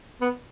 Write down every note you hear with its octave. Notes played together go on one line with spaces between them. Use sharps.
B3